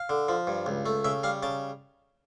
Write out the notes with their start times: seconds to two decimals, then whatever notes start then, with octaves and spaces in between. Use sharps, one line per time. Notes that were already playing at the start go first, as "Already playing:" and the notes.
Already playing: F5
0.09 D3
0.29 F3
0.47 G2
0.66 C#2
0.86 A3
1.05 C#3 E5
1.24 G3 F5
1.43 C#3 A5